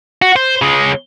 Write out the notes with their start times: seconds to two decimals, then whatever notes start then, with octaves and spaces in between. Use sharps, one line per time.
0.22 F#4
0.36 C5
0.62 C#3 G#3